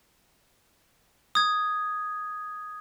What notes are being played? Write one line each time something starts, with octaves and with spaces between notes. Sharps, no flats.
D#6 G#6